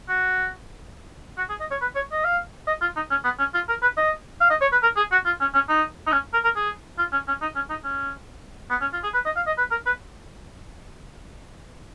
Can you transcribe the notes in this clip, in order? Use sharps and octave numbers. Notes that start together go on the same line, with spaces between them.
F#4
F#4
G#4
D#5
C#5
B4
C#5
D#5
F5
D#5
F4
D#4
C#4
B3
C#4
F4
A#4
B4
D#5
F5
D#5
C#5
B4
A#4
G#4
F#4
F4
C#4
C#4
D#4
D#4
C#4
A#4
A#4
G#4
F4
C#4
C#4
D#4
C#4
D#4
C#4
B3
C#4
F4
G#4
B4
D#5
F5
D#5
B4
A#4
B4